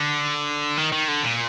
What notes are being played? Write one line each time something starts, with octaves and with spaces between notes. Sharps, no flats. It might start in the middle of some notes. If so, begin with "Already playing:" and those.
Already playing: D3
D#3
D#3
D3
A#2